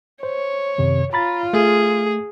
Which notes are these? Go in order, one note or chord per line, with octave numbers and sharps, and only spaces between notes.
C5 C#5
F#2 C3 D#3
F4 A#5 B5 A6
A3 G#4